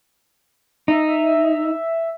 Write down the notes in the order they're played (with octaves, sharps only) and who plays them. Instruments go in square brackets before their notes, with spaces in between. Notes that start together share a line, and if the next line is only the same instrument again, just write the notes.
[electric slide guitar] D#4 [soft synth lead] E5
[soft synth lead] E5